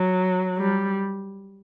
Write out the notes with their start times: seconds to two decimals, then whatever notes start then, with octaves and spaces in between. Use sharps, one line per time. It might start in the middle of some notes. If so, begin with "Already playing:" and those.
Already playing: F#3
0.58 G3